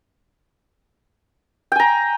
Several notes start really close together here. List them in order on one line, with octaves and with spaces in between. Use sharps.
G5 G#5 A#5